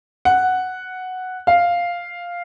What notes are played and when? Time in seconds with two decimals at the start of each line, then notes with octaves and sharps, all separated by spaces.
0.25 F#5
1.47 F5